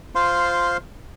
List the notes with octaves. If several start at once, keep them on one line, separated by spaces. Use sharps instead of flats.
F4 C5 F5 C6